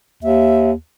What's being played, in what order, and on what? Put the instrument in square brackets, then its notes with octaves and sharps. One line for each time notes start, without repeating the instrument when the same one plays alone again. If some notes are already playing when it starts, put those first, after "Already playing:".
[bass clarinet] D#2 [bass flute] E5